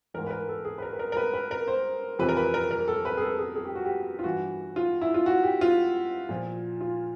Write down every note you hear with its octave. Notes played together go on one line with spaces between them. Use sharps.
G#2 E3 A#4
B4
A#4
A4
G#4
B4
A#4
B4
A#4
A#4
B4
B4
A#4
C5
F2 C3 E3 B4
A#4
B4
A#4
A#4
A4
B4
G#4
A4
G#4
G#4
G4
F#4
G4
F4
G2 E3 F#4
F4
E4
F4
F#4
G4
F4
A#2 F3
F4